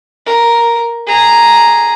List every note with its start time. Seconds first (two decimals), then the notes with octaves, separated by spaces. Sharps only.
0.26 A#4
1.07 G#4 A#5